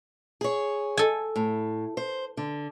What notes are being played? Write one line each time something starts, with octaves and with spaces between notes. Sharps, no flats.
G#4 C#5
A4 G#5
A2
C5
D3